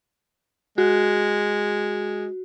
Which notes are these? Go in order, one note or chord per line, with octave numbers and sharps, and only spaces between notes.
G#3 F#4